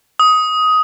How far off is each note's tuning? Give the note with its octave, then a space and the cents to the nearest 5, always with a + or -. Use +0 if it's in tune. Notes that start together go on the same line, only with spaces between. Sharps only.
D#6 +15